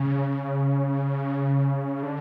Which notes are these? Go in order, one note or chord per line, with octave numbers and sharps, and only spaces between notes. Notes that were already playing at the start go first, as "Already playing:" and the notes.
Already playing: C#3
D3